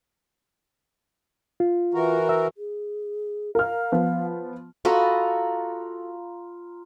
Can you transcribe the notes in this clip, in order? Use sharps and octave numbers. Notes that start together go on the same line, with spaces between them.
F4
E3 F#4 A#4
E5
G#4
A#4 F5 F6
F3 B3
F4 F#4 A4 D#5 A#5 B5